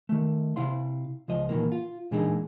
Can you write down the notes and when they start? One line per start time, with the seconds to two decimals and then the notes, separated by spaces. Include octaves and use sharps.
0.09 D#3 A3
0.56 C3 E4 F5 C6
1.28 C#2 F3 D#5
1.49 A#2 D#3 E3 A#3
1.72 F4
2.11 A#2 E3 G#3 D4 D#4 G#4